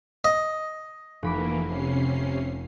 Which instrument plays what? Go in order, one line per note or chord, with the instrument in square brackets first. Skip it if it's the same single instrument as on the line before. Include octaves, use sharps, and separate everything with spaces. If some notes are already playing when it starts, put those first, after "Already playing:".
[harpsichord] D#5
[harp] F1 B5 D6 [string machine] E3 A#3
[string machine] C3 C#4 C7